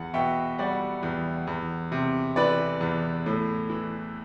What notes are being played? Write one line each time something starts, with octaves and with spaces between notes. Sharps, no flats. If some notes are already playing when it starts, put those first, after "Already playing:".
Already playing: E2 F#5
B2 E5 G5
G3 D5 F#5
E2
E2
C3
E3 B4 D5
E2
A2
E3